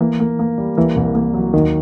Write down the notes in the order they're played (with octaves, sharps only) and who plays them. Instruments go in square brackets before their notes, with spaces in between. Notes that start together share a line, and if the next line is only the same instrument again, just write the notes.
[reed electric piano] E3 [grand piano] A#3
[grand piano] A#3
A#3
G3
[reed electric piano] E3 [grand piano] A#3
[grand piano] C2
A#3
F#3
[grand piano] D#2 [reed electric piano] D#3